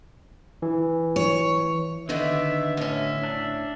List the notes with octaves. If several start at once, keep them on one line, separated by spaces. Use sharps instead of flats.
E3
C#5
D3 D#3 B3 D5 E5
A2 C#4 E5
D4